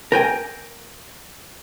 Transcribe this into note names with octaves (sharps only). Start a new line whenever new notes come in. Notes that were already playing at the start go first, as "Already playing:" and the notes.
A#4 G5 G#5